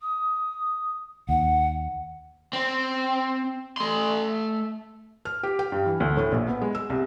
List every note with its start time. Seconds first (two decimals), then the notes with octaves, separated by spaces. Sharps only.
0.01 D#6
1.29 D#2 F#5
2.53 C4
3.77 A3 C6
5.25 F6
5.43 G4
5.59 G5
5.72 G2
5.86 E3
6.00 D2
6.17 A2
6.32 A#1
6.48 B3
6.62 G#3
6.75 E6
6.90 C2